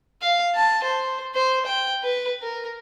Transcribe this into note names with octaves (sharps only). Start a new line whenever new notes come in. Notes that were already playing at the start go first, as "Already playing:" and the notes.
F5
A5
C5
C5
G5
B4
A#4